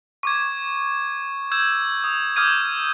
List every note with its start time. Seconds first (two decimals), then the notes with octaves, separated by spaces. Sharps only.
0.23 C#6 D6 G#6
1.51 E6 G6 G#6 E7
2.04 D#6
2.36 D6 D#6 F6 G6 G#6 D#7